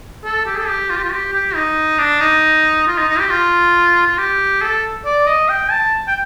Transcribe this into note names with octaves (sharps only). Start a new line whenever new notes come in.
A4
G4
A4
G4
F4
G4
F4
G4
G4
D#4
D4
D#4
F4
D#4
D#4
G4
F4
F4
G4
A4
D5
D#5
G5
A5
G5